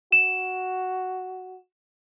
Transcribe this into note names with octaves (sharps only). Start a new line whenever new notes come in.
F#4 E7